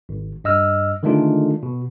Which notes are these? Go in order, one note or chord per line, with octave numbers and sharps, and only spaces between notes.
G#1
G2 D#5 E6 F6
D3 D#3 G#3 A3 D4 F4
B2